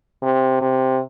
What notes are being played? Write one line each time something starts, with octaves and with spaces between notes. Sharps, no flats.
C3
C3